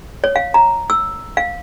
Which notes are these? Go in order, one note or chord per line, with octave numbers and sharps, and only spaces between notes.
C#5
F5
A#5
E6
F5